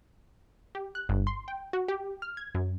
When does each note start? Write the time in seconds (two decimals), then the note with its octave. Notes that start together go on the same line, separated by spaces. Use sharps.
0.75 G4
0.95 F#6
1.09 G1
1.27 C6
1.48 G5
1.73 F#4
1.88 G4
2.22 F6
2.37 G#6
2.55 F#2